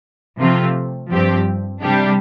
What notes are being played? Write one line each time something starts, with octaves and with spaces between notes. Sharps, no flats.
C3 F3 A3 C4 F4
G2 F3 C4 G4
C3 G3 D4 G4